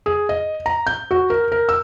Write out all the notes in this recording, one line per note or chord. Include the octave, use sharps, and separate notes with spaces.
G#4
D#5
A#5
G6
F#4
A#4
A#4
E6